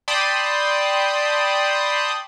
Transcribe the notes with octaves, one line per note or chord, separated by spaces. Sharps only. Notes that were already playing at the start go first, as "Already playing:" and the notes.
D5 G5 A5 B5 C6 D#6